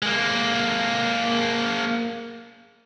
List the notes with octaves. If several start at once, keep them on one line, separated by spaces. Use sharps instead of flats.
G#3 A#3